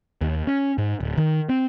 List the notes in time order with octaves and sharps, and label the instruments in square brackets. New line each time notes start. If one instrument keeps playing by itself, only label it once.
[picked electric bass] D#2
C#4
G#2
D1
D#3
C4